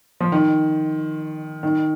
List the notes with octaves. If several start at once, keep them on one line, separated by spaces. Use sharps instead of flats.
F3
D#3
D#3